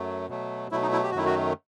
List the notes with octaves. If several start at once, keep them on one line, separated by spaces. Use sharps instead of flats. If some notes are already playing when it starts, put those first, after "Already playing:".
Already playing: F#2 F#3 A3
B2 F#3 A3
B2 F#3 A3 E4
D#4
E4
G4
F#4
F#2 D#3 F#3 A3 E4
F#4